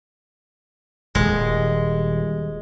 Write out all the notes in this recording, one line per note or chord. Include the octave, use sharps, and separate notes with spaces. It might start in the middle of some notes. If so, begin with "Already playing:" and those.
D#1 G#3